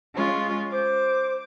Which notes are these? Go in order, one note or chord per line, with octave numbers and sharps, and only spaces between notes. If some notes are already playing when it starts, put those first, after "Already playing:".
G#3 C#4 F4
C5 D6